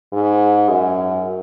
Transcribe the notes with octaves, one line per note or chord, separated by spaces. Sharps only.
G#2
F#2